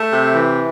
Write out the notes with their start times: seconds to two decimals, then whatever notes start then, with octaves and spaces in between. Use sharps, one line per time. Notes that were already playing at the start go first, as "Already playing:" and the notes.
Already playing: A3
0.12 C3
0.34 E3